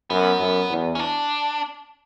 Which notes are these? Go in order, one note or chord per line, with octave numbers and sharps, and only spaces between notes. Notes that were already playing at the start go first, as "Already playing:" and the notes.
F#2 B3
F#2
E2
C#4
D4